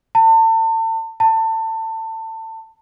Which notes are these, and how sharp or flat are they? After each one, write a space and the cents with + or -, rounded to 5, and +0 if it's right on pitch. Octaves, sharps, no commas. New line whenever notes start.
A5 +35
A5 +25